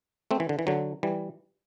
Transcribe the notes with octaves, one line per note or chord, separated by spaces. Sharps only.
A3 C4
E3
D3
E3
D3 F#3
E3 G3